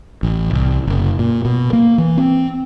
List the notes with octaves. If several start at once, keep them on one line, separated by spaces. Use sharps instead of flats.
A1
C2
F#1
A#2
B2
A#3
E3
C4